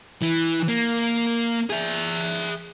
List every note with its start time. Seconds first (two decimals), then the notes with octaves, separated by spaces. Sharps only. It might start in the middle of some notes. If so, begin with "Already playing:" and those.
0.22 E3
0.68 A#3
1.70 G#4 E5